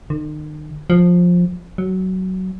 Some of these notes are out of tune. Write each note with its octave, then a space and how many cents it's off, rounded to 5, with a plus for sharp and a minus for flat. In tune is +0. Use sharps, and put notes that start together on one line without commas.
D#3 -40
F3 +15
F#3 +15